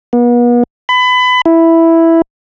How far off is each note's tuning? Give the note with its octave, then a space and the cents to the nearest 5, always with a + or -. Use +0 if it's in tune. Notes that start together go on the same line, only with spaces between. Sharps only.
B3 -40
B5 +25
E4 +0